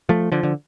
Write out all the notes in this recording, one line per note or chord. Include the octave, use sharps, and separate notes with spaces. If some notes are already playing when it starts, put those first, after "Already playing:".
F3 A3
D3 F3
D3